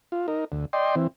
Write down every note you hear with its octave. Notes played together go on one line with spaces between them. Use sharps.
F4
D#4 A#4
D2
D5 D#5 G5 C6
E3 C4